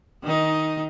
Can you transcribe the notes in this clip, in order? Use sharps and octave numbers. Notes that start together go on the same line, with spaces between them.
D#3 D#4